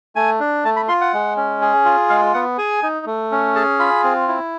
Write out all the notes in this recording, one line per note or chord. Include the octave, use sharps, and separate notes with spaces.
A3 G#5
D4
A3 A5
B5
F4 C6
F#5
G#3
C#4
G#4
F4
G#3 F5
B3 F#5
G#4 G#5
D#4
A3
C#4
G#4 A5
F4 B5
C4
E4